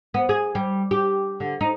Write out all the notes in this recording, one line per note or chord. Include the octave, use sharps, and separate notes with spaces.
B3
G#4
G3
G4
D3
D#4